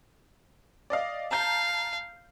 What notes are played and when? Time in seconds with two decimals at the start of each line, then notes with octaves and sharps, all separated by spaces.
0.90 D5 D#5 F5
1.31 F5 A5 A#5 G6